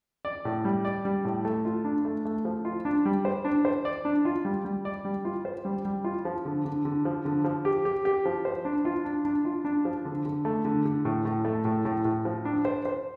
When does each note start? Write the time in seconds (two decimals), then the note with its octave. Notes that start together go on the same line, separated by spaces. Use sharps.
0.25 D5
0.45 A2
0.65 G3
0.85 D5
1.05 G3
1.25 A2
1.45 A3
1.65 F4
1.85 D4
2.05 A3
2.25 A3
2.45 F3
2.65 F4
2.85 D4
3.06 G3
3.25 C5
3.45 D4
3.65 C5
3.85 D5
4.05 D4
4.25 F4
4.45 G3
4.65 G3
4.85 D5
5.05 G3
5.25 F4
5.45 C5
5.65 G3
5.85 G3
6.04 F4
6.25 F3
6.45 D3
6.65 D3
6.85 D3
7.05 F3
7.25 D3
7.44 F3
7.65 G4
7.85 G4
8.05 G4
8.25 F3
8.45 C5
8.65 D4
8.85 F4
9.05 D4
9.25 D4
9.45 F4
9.65 D4
9.85 F3
10.05 D3
10.25 D3
10.45 A3
10.65 D3
10.85 D3
11.05 A2
11.25 A2
11.45 A3
11.65 A2
11.85 A2
12.05 A2
12.25 F3
12.45 D4
12.65 C5
12.85 C5